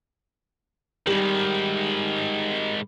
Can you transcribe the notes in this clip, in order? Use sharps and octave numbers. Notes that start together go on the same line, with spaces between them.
G#2 D#3 G3 F#7